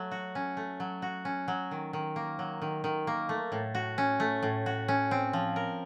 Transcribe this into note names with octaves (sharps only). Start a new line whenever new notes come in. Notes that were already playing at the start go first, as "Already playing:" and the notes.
Already playing: F#3 A3
F#4
C#4
A3
F#3
F#4
C#4
F#3
D#3
D#3
A#3
F#3
D#3
D#3
A#3
A3
A2
F#4
C#4
A3
A2
F#4
C#4
C4
F3
A#4